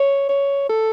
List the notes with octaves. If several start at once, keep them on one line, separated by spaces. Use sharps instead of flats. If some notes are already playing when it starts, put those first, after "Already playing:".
Already playing: C#5
C#5
A4